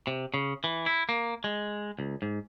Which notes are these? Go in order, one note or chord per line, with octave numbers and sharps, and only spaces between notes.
C3
C#3
E3
E4
A#3
G#3
C#2
G#2